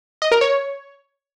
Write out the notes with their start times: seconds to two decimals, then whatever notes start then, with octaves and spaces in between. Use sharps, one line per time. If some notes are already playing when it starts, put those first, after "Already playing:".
0.22 D#5
0.31 A#4
0.41 C#5